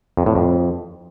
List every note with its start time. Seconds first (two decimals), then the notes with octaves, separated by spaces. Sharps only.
0.17 F2
0.26 A2
0.35 F2